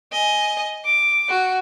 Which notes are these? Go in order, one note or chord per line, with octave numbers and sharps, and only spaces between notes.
D#5 G#5
D6
F#4